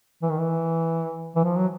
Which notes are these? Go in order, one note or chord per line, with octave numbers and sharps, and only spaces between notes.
E3
D#3
E3
E3
F3
F#3